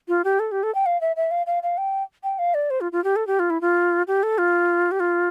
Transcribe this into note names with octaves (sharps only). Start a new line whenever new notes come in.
F4
G4
A4
G4
A4
G5
F5
E5
E5
F5
F5
F5
G5
G5
F5
D5
C5
F4
F4
G4
A4
G4
F4
E4
F4
G4
A4
F4
G4
F4